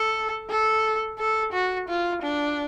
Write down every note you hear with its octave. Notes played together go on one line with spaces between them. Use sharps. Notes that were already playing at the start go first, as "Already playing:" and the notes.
Already playing: A4
A4
A4
F#4
F4
D4